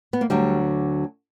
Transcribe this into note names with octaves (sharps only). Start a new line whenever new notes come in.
B3
A#3
D2 D3 F#3 G3